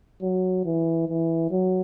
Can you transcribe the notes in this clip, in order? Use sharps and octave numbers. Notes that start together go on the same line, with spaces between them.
F#3
E3
E3
F#3